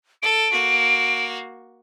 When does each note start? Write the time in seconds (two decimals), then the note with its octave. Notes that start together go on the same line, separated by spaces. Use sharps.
0.22 A4 D7
0.52 A#3 F#4